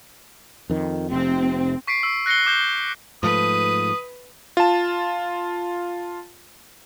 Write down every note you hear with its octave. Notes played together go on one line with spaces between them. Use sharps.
F2 D#3
F1 C3 C4
C#6 B6 C7 D7
C#6 E6
F#6 A#6 C7 C#7 G7
D6 G6 G7
G#2 F3 A3 B4 D#6
F4 A5